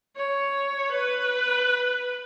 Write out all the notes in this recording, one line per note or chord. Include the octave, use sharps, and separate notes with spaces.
C#5
B4